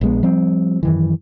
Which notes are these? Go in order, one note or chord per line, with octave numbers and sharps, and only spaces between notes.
A#1 G#3 B3
F3 G3 C4
F#2 D#3 E3